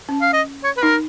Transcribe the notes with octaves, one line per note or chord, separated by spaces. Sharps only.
C#4
F5
D#5
C#5
B4
D#4 A#4